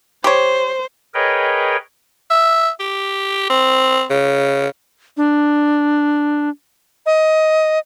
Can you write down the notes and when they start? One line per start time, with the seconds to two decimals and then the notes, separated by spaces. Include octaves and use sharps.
0.24 G4 C5 C#5
1.14 G#4 A#4 B4 C#5 D#5 G5
2.30 E5
2.80 G4
3.50 C4
4.10 C#3
5.17 D4
7.06 D#5